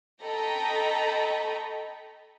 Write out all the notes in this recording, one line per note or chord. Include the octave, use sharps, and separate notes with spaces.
A4 D#5 G5 A#5 B5 C#6